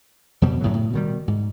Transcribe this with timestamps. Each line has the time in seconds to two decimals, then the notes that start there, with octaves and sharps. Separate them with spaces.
0.42 F2 B2 G3
0.61 F#2 A2 C#3 F#3
0.74 A2
0.93 B2 D#3 G3
1.28 G#2